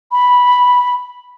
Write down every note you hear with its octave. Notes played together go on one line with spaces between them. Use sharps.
B5